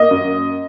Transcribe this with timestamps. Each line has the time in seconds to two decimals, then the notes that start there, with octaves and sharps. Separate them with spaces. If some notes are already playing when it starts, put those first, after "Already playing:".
Already playing: A#3 D#5
0.11 F#2